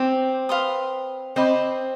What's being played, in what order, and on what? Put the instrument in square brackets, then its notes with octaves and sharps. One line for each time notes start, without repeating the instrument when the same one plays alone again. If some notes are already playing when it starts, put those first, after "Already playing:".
Already playing: [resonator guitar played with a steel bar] C4 [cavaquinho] G4 C5
[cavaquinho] B4 F5 C6 D#6
[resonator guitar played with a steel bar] C4 [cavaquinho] C5 D#5 B5 D6